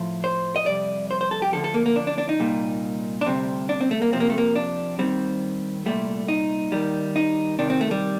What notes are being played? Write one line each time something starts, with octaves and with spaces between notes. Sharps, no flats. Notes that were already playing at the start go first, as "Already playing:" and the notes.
Already playing: A2 F3
C5
D#5
F2 C3 G3 D5
C5
C5
A4
G4
D2 D3 F3 A4
A4
A#3
A#3
D4
D4
D4
D#4
C2 A#2 G3
D4
D2 C3 G3 C4
D4
C4
A3
A#3
F2 C3 F3 C4
A#3
A3
A#3
D4
D#2 D#3 G3 C4
C2 A#2 G3 A3
D#4
D#2 D#3 G3
D#4
C2 C3 D#3 D4
C4
A3
G3